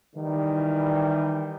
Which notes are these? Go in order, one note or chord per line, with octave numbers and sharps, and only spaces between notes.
D#3 E3 G3